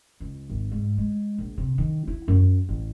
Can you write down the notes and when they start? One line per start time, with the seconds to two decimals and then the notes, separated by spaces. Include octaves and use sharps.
0.20 C#2
0.50 G#1
0.71 G#2
0.98 G#3
1.38 A#1
1.58 C3
1.78 D#3
2.07 E4
2.28 F#2
2.69 A1